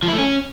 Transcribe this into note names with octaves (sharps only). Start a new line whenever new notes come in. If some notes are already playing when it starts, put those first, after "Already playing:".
F3
E4
A3
C#4